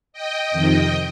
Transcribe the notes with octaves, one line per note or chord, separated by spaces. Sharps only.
D#5 G5
F2 C3 D#3